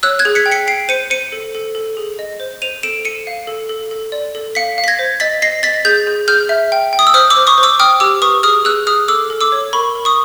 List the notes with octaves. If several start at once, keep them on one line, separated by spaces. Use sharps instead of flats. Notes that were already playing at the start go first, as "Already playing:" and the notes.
C#5 E6 F#6
F#6 G#6
G#4
B6 C#7
G5
B6 C#7
G5 C7 D7
C5 C#7 D#7
C5 C#7 D#7
A4
A4
A4
G#4
D#5
C5
C5 D#7 F7
A4 D7 E7
A4 C#7 D#7
F5
A4
A4
A4
D5
A4
F5 B6 C#7
F5
B6
G#6 A#6
C5
D#5 A6 B6
D#5 A#6 C7
D#5 A6 B6
G#4 G6 A6
G#4
G#4 F6 G6
E5
G5
G5
D#6
E6
C5 D#6 F6
D6 E6
C5
C#6 D#6
C5
D6 E6
G5 D#6 F6
G4 D6 E6
B4 C#6 D#6
G#4 D#6 F6
G#4 E6 F#6
G#4 D#6 F6
A4 D6 E6
A4
D6 E6
C#5
A#4 B5 C#6
A#4
C#6 D#6